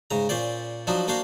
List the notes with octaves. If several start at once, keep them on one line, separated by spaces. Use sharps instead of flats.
G#2 C#3 A#5
A#2 C#4 C5 D5
F3 F#3 D4 D#4
A#3 D4 F#4 C5 F5